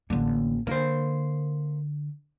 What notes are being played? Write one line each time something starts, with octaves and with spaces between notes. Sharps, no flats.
A1 D3 A#3
D3 A#3 A#4 C5